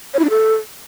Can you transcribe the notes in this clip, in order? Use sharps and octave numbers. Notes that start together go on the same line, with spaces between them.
C#5
E4
D4
A4